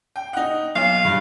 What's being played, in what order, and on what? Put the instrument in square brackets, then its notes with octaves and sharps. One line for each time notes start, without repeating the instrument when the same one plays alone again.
[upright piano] G5
D#4 F#5
[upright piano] B1 [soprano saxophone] F5
[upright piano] G2